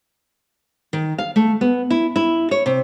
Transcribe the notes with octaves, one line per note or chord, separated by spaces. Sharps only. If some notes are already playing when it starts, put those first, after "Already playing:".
D#3
F5
A3
B3
E4
E4
C#5
C3